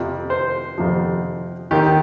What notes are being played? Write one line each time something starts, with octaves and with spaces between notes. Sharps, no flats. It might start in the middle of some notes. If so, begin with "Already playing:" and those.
Already playing: F2 C3 F3
C5
F2 C3 F3
D#2 D#3 G4